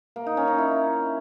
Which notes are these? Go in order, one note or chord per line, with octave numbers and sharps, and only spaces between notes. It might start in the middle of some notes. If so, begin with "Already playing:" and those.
A#3
D#4
C#4
D#4
E4